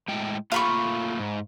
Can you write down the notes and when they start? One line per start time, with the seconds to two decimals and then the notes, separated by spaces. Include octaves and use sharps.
0.08 A2 G#3 G5
0.52 A3 A#3 F4 F5 B5 C#6
1.19 G#2